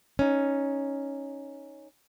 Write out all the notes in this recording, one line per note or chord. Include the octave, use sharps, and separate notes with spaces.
C#4 D#4